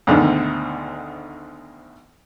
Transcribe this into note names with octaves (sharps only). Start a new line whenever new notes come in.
D2 G#2 B2 D3 D#3